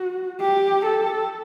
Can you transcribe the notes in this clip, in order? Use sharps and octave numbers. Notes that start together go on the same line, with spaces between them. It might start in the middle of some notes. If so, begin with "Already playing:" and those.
Already playing: F#4
G4
A4